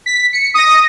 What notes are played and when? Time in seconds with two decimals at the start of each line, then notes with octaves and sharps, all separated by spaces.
0.06 B6
0.33 C#7
0.54 D#6 A#6